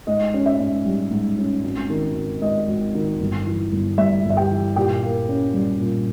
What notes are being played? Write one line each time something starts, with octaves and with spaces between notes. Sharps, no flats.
G#2 D#5
C#4
E5
G#2
G3
G#2
C#4
G#1
D#3
G#1
G#2 D#5
G#1
D#3
G1
E3
G1
G2 E5
G1
E5
G4 G5
E3
A#2 G4 G5
A#3
C#4
G3
A#2